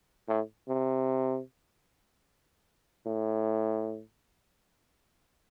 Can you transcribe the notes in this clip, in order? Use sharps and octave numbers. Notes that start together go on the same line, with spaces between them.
A2
C3
A2